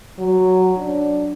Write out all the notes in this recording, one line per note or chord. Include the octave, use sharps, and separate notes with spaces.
F#3
D4